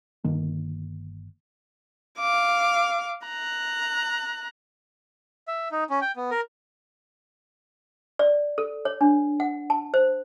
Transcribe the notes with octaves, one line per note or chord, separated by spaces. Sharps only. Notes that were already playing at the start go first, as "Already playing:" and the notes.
G1 D#3 A#3
F5 D6
A#5 F#6
E5
D#4
C#4
G5
B3
A#4
D5
A4
C#5
D4
F#5
A5
C5